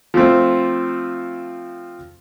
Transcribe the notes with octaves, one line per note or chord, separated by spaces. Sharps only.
F3 A3 C4